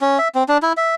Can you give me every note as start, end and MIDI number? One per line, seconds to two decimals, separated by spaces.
0.01 0.18 61
0.18 0.28 76
0.35 0.43 60
0.48 0.58 62
0.63 0.73 64
0.77 0.95 76